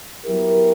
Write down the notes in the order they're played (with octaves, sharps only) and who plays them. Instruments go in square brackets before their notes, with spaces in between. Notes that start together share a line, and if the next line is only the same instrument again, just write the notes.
[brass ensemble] F#3 B3 E4 G4 A#4